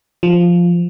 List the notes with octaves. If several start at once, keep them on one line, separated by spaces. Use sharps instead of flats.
F3